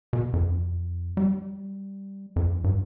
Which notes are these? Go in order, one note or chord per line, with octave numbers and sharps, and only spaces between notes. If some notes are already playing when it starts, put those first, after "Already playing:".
B2
F2
G3
F2
G2